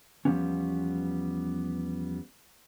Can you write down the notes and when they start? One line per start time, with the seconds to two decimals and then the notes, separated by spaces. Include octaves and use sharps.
0.25 E2 C#3 F3 G3 B3 C#4